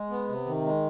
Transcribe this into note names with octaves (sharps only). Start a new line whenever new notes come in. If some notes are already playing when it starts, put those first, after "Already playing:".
Already playing: G#3
B3
C3
D#3
G#3